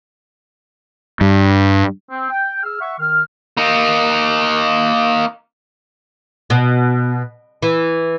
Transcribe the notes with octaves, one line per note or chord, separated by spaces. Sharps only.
G2
C4
G5
G#4 E6 F6
E5 F#5 C#6
D#3 F6
A#3 D#4
B2
E3